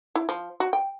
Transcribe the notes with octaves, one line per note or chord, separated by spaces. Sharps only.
E4
F3
F#4
G5